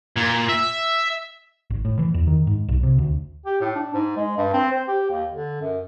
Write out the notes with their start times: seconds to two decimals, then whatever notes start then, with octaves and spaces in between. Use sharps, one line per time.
0.16 A#2
0.49 E5
1.70 G#1
1.85 A2
1.99 E3
2.14 E2
2.27 D#3
2.47 G#2
2.69 B1
2.83 C3
2.98 D2
3.46 G4
3.61 A2
3.75 D4
3.94 G#2
4.17 G#3
4.37 G2
4.53 C4
4.72 C5
4.88 G4
5.10 D#2
5.32 D3
5.61 F#2